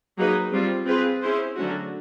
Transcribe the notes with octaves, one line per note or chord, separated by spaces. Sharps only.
F#3 A#3 D#4 G#4 B4
G3 C4 F4
C4 F4 G#4 B4
C#4 E4 G#4 C5
D3 F#3 A3 C#4 F#4